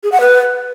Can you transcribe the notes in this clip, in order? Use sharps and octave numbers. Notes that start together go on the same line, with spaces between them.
G#4
F#5
B4